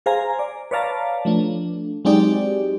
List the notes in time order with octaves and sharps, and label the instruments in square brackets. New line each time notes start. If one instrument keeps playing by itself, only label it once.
[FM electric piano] G#4 C5 F5 G#5 A#5
D5
B4 C#5 D5 F5 A5 A#5
F3 A3 D4
F#3 G#3 C4 D#4 G4 D5